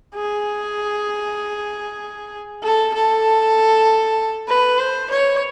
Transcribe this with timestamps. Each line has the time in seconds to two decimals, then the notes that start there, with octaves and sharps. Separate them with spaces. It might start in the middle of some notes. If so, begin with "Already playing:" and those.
0.15 G#4
2.63 A4
2.94 A4
4.48 B4
4.78 C5
5.10 C#5